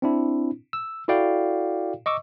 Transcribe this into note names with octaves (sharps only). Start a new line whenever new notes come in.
C4 D4 E4
E6
E4 F#4 A4 D5 F5 G5
D#5 C#6 D6 E6